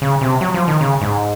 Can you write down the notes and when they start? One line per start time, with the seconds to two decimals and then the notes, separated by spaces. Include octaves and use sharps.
0.02 C#3
0.21 C3
0.41 F#3
0.54 F3
0.68 D#3
0.81 C#3
1.01 G#2